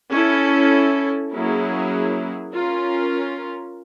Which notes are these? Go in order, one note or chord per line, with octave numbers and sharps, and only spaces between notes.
C#4 E4 A4
F#3 A#3 C#4 E4 G#4
C#4 F4 A#4